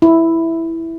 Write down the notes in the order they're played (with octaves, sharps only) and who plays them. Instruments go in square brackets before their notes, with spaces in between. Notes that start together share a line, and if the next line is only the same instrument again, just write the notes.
[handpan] E4